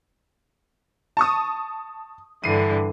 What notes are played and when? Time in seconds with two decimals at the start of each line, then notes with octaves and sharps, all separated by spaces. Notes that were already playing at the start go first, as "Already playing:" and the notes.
1.17 A5 C#6 D#6
2.44 G2 D3 E3 C7 D#7